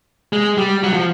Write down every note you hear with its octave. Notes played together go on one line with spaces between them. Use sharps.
G#3
G3
F#3
F3